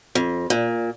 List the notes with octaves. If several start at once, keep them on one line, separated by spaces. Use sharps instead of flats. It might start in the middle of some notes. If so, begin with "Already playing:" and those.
F2
A#2